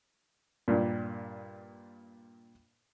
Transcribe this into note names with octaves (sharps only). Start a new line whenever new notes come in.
G2 A#2